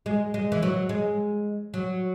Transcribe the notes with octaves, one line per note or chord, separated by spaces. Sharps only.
G#3
G#3
E3
F#3
G#3
F#3